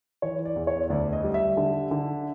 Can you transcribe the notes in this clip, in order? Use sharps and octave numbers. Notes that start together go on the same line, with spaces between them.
E3 C#5
D5
E2
C#5
D2 D5
D#5
G3
E5
D3
D3